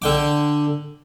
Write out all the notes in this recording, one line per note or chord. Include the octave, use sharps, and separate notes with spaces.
D3 G5 D6